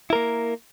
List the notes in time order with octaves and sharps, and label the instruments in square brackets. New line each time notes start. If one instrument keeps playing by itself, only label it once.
[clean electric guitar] E4
A#4
A#3